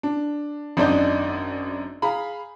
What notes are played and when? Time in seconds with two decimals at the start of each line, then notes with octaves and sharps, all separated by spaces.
0.03 D4
0.77 G#1 F#2 D4 D5 D#5 G6
2.02 G#4 F5 A#5 B5